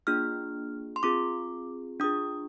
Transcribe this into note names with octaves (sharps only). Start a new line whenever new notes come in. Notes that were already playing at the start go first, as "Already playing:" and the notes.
A#3 D4 F4 G#4 F6
C6
C4 F4 G#4 D6
D4 F4 G#4 D#6